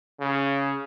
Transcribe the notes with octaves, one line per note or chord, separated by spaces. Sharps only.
C#3